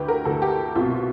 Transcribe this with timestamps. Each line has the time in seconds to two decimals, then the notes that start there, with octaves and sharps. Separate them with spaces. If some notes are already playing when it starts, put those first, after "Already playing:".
Already playing: D2 D3 G4 B4
0.08 A#4
0.25 D2 D3 A4
0.42 G4
0.75 C2 B2 F4